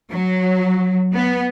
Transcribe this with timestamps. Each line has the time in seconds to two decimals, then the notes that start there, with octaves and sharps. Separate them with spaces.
0.11 F#3
1.12 B3